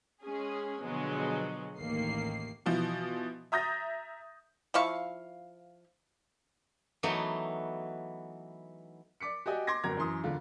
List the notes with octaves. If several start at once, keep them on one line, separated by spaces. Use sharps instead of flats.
G#3 C#4 G#4
B2 D3 F3 F#3 G#3 B3
A1 D#2 D#3 A#3 C7
B2 E3 F3
E5 A#5 D#6 G6 A6 A#6
F3 E4 F5 C#6
E3 F#3 A3 B3 D#4 F#4
D5 D6 B6 C#7
F#4 G4 D5 D#5 G#5
C6 D6 G#6 A#6
G1 F#2 F#4 A#4 A#5 G#6
F#2 E3 C6 D#6
E1 D3 F4